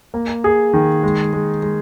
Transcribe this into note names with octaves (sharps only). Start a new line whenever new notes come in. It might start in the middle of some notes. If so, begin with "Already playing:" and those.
A#3
G#4
D#3
G#3
G#3
G#3